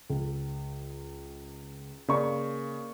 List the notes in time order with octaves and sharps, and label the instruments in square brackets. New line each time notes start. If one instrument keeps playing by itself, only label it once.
[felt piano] C#2
[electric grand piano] C#3 [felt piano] A#3 D5 C#6